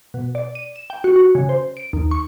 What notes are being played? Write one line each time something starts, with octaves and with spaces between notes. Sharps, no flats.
B2
D5
D#7
E7
G5
F#4
F#4
C#3
C5
D7
D#2
C#6